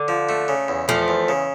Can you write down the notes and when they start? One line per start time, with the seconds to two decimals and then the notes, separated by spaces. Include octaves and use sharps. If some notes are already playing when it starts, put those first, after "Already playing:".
Already playing: D3
0.08 F3
0.29 A3
0.48 C#3
0.68 E2
0.88 E2 F3 A3
1.08 E2
1.29 C#3